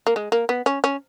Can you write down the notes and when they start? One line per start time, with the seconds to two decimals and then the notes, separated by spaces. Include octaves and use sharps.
0.07 A#3
0.16 G#3
0.32 A#3
0.49 B3
0.66 C#4
0.84 C#4